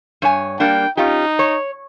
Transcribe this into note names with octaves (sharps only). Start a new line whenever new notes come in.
G2 C#5 G#5
G3 A#3 D4 G5
C#4 D#4 F4 G4
C#5